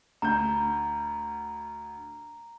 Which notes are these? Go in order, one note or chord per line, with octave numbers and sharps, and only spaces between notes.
D2 A#5 G6